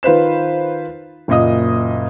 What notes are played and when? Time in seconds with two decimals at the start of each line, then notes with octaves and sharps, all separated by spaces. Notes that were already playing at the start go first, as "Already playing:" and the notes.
0.03 D#3 F4 B4 C5 E7
1.28 F#1 A#2 D#5 D#6